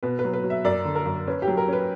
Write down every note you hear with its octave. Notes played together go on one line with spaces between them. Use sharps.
B2 B4
B4
F#3
B4
F#3
E5
F#2 D5
D3
A#4
F#2
C#4 B4
G4
F#3
A#4
C#4 B4